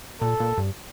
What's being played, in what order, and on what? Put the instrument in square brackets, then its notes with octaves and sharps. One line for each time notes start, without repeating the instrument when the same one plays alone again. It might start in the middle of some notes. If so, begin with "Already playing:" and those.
[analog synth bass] A#2 [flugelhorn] A4
[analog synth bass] A#2
G2